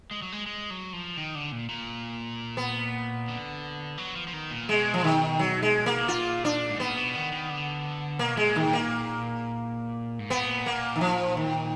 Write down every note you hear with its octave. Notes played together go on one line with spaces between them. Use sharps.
G#3
F#3
G#3
G#3
F#3
F3
D#3
D3
A#2
A#2
B3
D3
F#3
F3
F3
D#3
A#2
B2 G#3
F3
D#3
F#3
G#3
A#3
B2
A#2 F4
D4
G#2
A#2 B3
B2
D#3
D#3
D3
B2 A#3
B2 G#3
A#2
D#3
A#2
A#3
G#2
A#2 B3
A#3
D#3
F3
D#3